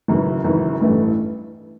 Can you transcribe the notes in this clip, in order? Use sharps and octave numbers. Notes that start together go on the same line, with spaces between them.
G#1 F#2 C#3 E3
G#1 F#2 C#3 E3
A1 G2 E3 A3